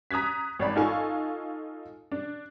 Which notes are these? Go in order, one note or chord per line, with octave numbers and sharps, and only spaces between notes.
A#5 D#6 F#6 G#6 B6
G#1 C#5 D5 B5
D#4 F4 A4 F5 G#5 C#6
D4